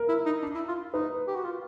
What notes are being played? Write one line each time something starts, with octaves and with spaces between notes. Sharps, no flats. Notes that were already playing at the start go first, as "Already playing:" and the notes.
Already playing: A#4
E4
D#4
D4
E4
F4
D#4 B4
G4
F#4
F4